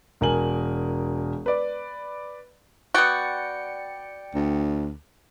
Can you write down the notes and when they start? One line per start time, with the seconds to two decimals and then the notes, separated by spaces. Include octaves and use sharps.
0.21 E1 A#4 G#5 F#7
1.46 B4 D5
2.94 B3 F#4 D5 G5 C#7
4.35 D2